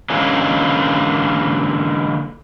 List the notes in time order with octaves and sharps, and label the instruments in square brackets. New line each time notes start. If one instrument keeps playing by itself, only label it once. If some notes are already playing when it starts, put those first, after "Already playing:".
[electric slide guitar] D3 E3 G#3 A#3 C#4